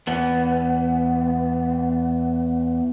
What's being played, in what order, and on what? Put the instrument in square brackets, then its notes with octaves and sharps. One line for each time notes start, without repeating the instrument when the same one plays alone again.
[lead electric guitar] E2 B3